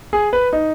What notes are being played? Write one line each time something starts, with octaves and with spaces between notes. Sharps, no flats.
G#4
B4
D#4